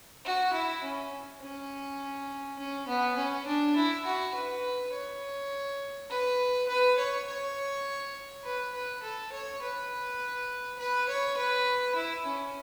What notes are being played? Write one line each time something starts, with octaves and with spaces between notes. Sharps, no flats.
F#4
E4
C#4
C#4
C#4
B3
C#4
D4
E4
F#4
B4
C#5
B4
B4
C#5
C#5
B4
B4
A4
C#5
B4
B4
C#5
B4
E4
C#4